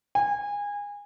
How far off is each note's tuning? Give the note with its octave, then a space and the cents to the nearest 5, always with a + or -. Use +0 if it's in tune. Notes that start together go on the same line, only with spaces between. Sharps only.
G#5 -25